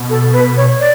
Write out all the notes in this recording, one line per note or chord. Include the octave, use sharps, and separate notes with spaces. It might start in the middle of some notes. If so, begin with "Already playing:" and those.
Already playing: B2
A4
B4
C#5
D5